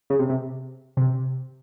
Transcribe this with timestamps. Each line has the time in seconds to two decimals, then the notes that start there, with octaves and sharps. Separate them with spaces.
0.10 C#3
0.19 C3
0.29 C3
0.97 C3